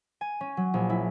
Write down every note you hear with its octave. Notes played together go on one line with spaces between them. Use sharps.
G#5
C#4
F#3
A#1
E4